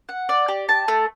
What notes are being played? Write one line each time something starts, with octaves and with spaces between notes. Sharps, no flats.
F#5
D5
G4
A5
A3